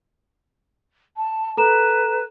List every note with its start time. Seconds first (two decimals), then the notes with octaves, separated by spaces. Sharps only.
1.17 A5
1.57 A4 B4 A#5 E7